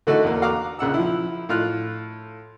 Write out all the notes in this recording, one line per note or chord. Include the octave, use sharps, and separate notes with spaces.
D3 E3 A3 D#4 F#4 A4
E2 A#3
F#4 F5 A#5 D6
A#1 C#3 F#5 E6
F3 E4
A2 F4 F6 F#6